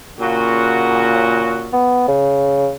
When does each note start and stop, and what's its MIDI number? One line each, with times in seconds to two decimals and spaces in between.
0.19 1.78 46
0.19 1.78 49
0.19 1.78 66
1.73 2.05 59
2.08 2.73 49